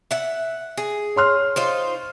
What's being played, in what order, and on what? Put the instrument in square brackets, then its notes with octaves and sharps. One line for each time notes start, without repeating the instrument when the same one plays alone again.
[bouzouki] E5 F#5
G#4
[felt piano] C#5 C6 F6
[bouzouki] D#4 F4 C5